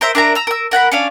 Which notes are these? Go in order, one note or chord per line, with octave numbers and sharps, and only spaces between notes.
A#4 C5 E5
D4 A#4 E5 A#5
A#5 E6
A#4 E6
A#4 F#5 G5 B5
C#4 D4 F5